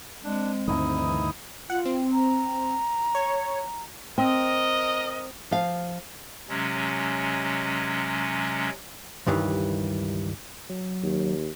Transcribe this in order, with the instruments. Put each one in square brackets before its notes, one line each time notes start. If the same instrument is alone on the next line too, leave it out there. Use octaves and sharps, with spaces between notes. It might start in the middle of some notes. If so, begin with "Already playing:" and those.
[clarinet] G#3 [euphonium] C4 [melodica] D4
[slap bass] D2 G2 D#3 [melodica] D#4 E4 D#6
[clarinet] E3
[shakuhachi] F4 [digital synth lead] F#5
[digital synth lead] C4
[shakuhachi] A#5
[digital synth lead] C#5
[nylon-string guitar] C4 [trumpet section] A#4 D#5
[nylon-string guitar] F3 F5
[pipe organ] C3 F#3 G#3 C#4
[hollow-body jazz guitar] C#2 G2 D#3 E3 G3
[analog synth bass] F#3
[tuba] D#2